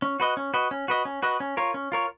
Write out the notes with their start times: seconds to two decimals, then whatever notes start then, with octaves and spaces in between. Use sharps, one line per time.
0.02 C#4
0.20 F#4 B4 D#5
0.37 C#4
0.54 F#4 B4 D#5
0.71 C#4
0.88 F#4 B4 D#5
1.05 C#4
1.22 F#4 B4 D#5
1.40 C#4
1.57 F4 A#4 C#5
1.74 C#4
1.92 F4 A#4 C#5